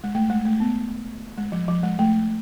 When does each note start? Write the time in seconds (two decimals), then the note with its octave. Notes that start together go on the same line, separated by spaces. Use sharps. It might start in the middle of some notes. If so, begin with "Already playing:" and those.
0.04 G#3
0.15 A3
0.30 G#3
0.45 A3
0.60 B3
1.38 G#3
1.52 F3
1.68 F3
1.83 G#3
1.99 A3